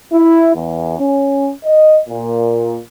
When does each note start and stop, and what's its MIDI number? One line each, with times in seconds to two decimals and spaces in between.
0.12 0.53 64
0.54 0.96 40
0.99 1.51 61
1.65 1.98 75
2.09 2.79 46